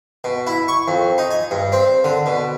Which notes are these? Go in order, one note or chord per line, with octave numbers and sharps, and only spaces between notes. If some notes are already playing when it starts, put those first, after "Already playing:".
B2
E4
C#6
F2
D#4
G#5
G2
C4
D3
B2